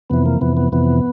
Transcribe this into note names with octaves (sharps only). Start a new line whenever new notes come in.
F2 C3 E3 B3
A#3
F2 C3 E3 B3
B3
F2 C3 E3 B3